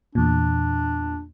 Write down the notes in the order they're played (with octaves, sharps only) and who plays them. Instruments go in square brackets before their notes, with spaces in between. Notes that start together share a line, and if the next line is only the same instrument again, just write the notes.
[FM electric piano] E2 A#2 [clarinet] D4